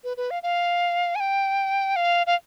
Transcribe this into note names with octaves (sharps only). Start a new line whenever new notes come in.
B4
B4
F5
F5
G#5
G5
F5
F5